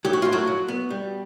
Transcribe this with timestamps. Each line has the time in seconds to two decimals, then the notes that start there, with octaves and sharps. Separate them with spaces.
0.05 F#3 G4
0.13 F#4
0.22 A2 F4
0.32 F#3 F#4
0.47 F#3
0.69 B3
0.90 G3